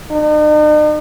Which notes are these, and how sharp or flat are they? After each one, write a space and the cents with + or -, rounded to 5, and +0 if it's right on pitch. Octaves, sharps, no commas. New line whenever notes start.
D#4 -45